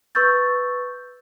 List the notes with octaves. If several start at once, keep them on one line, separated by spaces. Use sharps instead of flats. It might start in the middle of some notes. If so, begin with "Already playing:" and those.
B4 C#6 E6 G6 A6